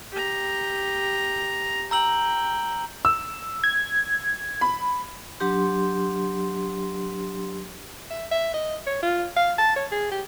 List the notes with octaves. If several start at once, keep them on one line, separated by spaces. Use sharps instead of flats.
G4 A#5
G5 A#5 E6 F#7
E6
G#6
B5
F#3 D4 G4 C6
E5
E5
D#5
C#5
F4
F5
A5
C#5
G#4
G4